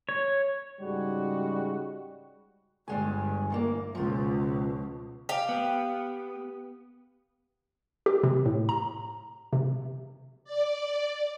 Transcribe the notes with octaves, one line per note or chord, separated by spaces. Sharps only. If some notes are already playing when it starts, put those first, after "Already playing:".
C#5
G#2 C#3 G3 G#3 F#4
G1 G2 G3 G#3 G#5
D2 E3 A#3
C#2 B2 F3
G4 F5
B3
G4
C3
A2
A#5
C3
D5